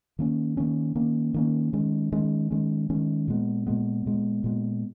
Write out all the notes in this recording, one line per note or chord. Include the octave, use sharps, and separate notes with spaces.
D#3 A#3 C#4
D#3 A#3 C#4
D#3 A#3 C#4
D#3 A#3 C#4
D#3 G#3 C#4
D#3 G#3 C#4
D#3 G#3 C#4
D#3 G#3 C#4
A#2 G#3 B3
A#2 G#3 B3
A#2 G#3 B3
A#2 G#3 B3